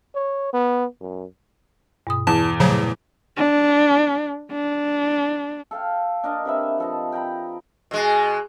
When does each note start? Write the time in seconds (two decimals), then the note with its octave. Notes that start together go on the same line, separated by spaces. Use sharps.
0.15 C#5
0.53 B3
1.01 F#2
2.07 G2 B2 D#6
2.27 E2 A5
2.60 A#2 C#3 F3 F#3 A3
3.37 D4
4.52 D4
5.71 A4 F5 G5
6.23 D4 A#4 D#5
6.45 C3 B4 E5
6.78 F3 A4 D#5
7.12 G5 A#5 B5
7.91 B2 G#3